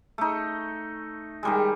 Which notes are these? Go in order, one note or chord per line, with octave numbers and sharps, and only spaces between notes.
A3 D#4
D#3 G3 G#3